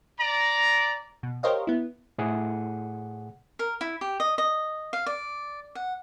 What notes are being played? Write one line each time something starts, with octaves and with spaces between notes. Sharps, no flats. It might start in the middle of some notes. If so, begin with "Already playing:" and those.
D5 A#5
B2
G4 A#4 C5 C#5 D#5 F5
B3 E4
A2 G#4 F#5
A#4
E4
G4
D#5
D#5
F5
D5
F#5